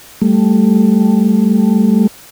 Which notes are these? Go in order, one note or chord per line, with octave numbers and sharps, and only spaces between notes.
G3 A3